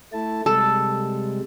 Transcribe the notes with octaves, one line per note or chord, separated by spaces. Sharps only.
A3 E4 A5
C3 G3 G#3 A4